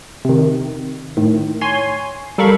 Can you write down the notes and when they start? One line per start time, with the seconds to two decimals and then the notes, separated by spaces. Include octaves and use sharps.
0.25 C3 D#3
1.17 A2 D#3
1.61 C#5 G#5 C6
2.38 G3 A4 A#4 F5 B5 C#6